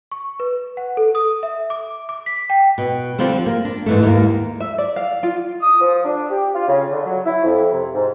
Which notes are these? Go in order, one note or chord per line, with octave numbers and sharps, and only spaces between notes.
C#6
B4
F#5
A4
D#6
E5
D6
D6
B6
G5
B2
D3 F3 G3 C4
A#3
D4
G#2 E3 A3
D#2 G#2 A#3
E5
D5
F5
F4
D#6
F3
D4
G4
F4
C#3
D3
F#3
E4
F2
C3
G#2